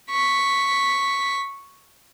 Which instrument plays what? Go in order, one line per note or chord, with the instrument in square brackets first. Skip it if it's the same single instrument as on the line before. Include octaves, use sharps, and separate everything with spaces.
[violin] C#6 B6